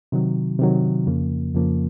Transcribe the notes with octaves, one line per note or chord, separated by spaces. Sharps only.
C3 D#3 F#3
C3 D#3 F#3
F2 C#3 F3 A#3
F2 C#3 F3 A#3